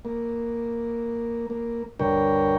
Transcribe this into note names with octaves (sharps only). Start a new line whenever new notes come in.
A#3
A#3
D2 G2 D3 A#4 C#5 G5